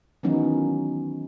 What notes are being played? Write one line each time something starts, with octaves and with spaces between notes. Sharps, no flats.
D#3 E3 F#3 B3 C#4 D#4